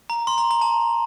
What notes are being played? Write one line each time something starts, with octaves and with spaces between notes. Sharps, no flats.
A#5
C6
A#5
A#5
A5